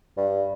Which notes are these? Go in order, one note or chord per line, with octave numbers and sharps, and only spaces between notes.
G2